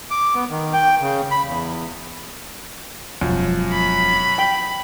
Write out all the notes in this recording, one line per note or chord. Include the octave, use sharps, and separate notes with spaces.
D6
B3
D#3
G5
C#3
B5
E2
E1 F#2 F3 B3
B5
G5